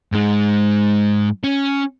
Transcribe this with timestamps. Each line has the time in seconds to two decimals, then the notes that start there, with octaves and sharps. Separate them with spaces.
0.12 G#2 G#3
1.44 C#4